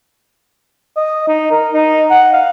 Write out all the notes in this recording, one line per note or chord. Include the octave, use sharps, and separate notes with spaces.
D#5
D#4
A#4
D#4
F#5
F5